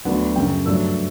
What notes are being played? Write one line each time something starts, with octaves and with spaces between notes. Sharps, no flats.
D2 D3 F#3 B3 D4 F#5
F#2 C#3 F#3 G5
G2 F#3 A3 D4 E6